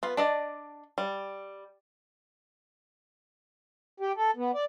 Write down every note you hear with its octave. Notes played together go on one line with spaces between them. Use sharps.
B3 F4
D4 D5 D#5
G3
G4
A4
B3
D5